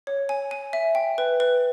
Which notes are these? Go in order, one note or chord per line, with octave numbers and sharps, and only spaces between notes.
C#5
G#5
G#5
E5
G5
B4
B4